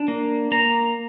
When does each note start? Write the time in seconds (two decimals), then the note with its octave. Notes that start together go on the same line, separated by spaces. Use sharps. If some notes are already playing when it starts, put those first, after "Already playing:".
Already playing: D4
0.08 A#3
0.52 A#3 A#5